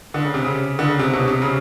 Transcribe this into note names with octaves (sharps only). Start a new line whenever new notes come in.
D3
C#3
C3
C#3
D3
C#3
C3
B2
C3
C#3